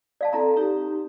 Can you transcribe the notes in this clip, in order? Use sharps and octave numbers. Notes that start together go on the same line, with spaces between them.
D5 F5 A5
C4 E4 A4 D5 A#5
C4 D#4 G4